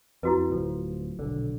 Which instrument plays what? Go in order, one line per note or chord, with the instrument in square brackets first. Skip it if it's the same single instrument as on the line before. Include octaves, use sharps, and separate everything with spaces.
[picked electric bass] F2 [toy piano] E4 F#4 B4
[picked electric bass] D1 F3
D#1 B1 D3